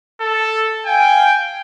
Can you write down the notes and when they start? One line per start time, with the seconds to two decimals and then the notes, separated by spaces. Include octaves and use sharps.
0.21 A4
0.86 F5 G5 G#5